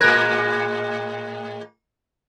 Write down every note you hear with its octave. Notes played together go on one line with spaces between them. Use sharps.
A2 G#3 A#4 F#6 G#6 A#6